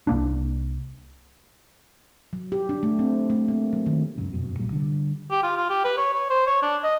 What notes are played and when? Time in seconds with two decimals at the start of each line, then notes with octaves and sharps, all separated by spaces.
0.07 C2 A#3 D4
2.33 F#3
2.52 G4
2.69 D4
2.83 A3
2.99 C4
3.30 A3
3.48 A#3
3.73 F#3
3.86 D#3
4.18 C#2 F#2 C#3
4.33 F1 F#2 B2
4.59 C2 A#2 F#3 G3
4.72 D3 G3
5.31 G4
5.43 F4
5.56 F4
5.70 G4
5.84 B4
5.97 C#5
6.14 C#5
6.30 C5
6.47 C#5
6.62 D4
6.84 D#5